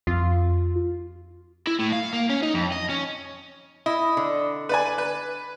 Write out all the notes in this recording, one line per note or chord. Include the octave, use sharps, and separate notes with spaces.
F2 F4
E4
A2
F5
A#3
C#4
D#4
F2
D#5
C#4
E4 D#5
D3
B4 D5 G#5
B4